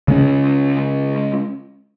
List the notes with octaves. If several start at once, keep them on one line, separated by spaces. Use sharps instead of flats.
C#3 G#3 C#4